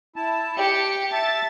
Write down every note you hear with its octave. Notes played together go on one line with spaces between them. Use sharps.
E4 A5
G4 G5 C#7
E5 A5 A6